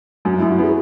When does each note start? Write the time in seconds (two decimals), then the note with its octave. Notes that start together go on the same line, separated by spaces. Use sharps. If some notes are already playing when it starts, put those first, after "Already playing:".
0.25 F#2 F#4
0.38 F#2 E4
0.50 F#4
0.59 B3 G#4